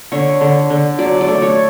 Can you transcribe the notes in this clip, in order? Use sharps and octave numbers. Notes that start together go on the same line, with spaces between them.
D3 C#5
D3
D3
F#3 D5
D5
A3
C#5